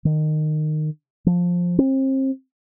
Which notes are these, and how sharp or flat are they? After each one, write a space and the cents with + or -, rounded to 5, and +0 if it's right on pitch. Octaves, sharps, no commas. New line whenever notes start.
D#3 -20
F3 +10
C4 +35